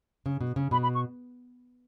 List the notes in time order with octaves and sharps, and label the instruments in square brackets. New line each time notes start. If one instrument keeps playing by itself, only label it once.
[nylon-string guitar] C#3
B2
C#3
[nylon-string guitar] B2 [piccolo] B5
[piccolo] B5
C#6